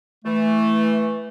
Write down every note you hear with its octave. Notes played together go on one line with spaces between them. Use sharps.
E3 A3